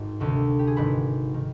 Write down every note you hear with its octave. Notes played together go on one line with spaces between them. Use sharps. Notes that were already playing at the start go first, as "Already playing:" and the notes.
Already playing: G#1 G#2
D2 C3 D#3
G4
G#4
G#1 G#2 D#3 B4
D#3